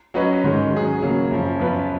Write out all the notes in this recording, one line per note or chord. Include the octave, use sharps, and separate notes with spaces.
F#3 C#4 F#4 B4 D#5
G#2 D#3 G#3 C#4
F#3 C#4 G#4
C#3 F#3 A#3
F#2 C#3 F3
F#2 F3 B3 F4 B4